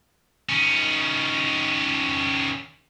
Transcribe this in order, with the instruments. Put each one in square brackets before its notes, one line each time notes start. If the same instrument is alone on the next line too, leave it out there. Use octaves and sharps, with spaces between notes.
[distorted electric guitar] D#3 C#4